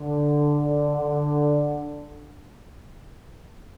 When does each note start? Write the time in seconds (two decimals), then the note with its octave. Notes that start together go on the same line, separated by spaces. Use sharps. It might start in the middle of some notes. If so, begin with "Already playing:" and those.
Already playing: D3
0.61 D3
0.95 D3